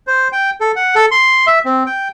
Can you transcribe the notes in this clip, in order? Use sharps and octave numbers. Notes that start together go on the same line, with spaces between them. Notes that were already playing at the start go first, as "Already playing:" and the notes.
C5
G5
A4
F#5
A4
C6
E5
C4
G5